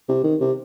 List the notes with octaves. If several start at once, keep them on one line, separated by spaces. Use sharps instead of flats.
C3
D#3
C3